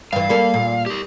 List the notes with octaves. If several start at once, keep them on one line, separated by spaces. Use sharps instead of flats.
G2 E3 F5
G3 A#3 A4
A#2
G4 A#4